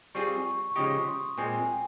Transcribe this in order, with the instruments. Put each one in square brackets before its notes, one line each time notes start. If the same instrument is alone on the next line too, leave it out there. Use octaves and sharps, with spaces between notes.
[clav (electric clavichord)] G3 C4 F4 G#4 [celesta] C#6
[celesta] C#6
C#6
[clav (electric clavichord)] C#3 F3 G#3 D#4 G4 [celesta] D#6
[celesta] C#6
C6
[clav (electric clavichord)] A#2 G#3 C4 [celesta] G#5
[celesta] G5